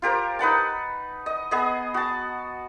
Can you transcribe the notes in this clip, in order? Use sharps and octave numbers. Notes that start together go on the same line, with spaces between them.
F4 G4 A#4 C5
D#4 B4 F#5 A5
D#5
B3 G#4 D#5
F#4 A5